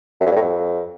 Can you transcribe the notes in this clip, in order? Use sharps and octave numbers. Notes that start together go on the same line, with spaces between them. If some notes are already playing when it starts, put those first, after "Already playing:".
F#2
F2
G2
A2
F2